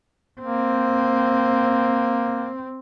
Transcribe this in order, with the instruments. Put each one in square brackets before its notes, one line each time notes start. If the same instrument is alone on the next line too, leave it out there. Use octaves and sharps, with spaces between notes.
[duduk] A#3 [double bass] C4